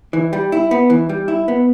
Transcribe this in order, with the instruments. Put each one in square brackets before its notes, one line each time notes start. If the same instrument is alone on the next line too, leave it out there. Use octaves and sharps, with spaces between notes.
[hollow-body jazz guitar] E3
G3
E4
B3
E3
G3
E4
B3